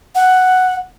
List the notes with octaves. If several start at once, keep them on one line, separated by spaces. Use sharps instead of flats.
F#5